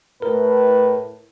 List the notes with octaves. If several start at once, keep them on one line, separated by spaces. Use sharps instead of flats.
A2 A#4 B4